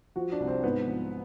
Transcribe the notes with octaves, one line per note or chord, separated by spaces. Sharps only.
F3 F#4
D4
C2
C4
G#2 B3
F3